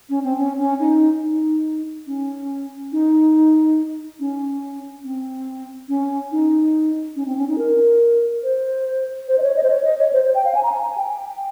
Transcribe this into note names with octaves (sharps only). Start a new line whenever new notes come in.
C#4
C4
C#4
C#4
D#4
D#4
C#4
D#4
C#4
C4
C#4
D#4
C#4
C4
C#4
D#4
A#4
C5
C5
D#5
C#5
D#5
C5
C#5
D#5
C#5
C5
C5
G5
F5
G#5
A#5
G#5
A#5
G#5
G5